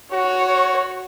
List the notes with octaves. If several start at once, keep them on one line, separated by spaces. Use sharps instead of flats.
F#4 C#5